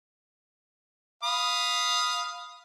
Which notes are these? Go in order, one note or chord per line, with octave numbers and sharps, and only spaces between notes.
F5 B5 D#6